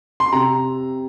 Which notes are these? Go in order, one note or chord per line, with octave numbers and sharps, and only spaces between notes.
C6
C3 A#5